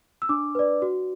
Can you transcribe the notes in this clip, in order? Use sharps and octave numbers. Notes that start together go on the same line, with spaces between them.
E6
D4 D6
B4 D5
F#4